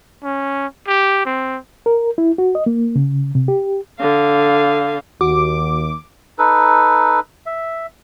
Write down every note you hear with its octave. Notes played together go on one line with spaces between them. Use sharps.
C#4
G4
C4
A#4
E4
F#4
D#5
A#3
C#3
C3
G4
D3 F5
D#2 F#4 D6
D#4 A4 B4
E5